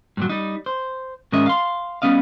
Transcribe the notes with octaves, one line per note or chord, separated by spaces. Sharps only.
G2 A#2 F#3
G3 D#4
C5
G#2 D#3 C#4 A#4 D#5 E5
F5 C6
G3 B3 C#4 D#5 F5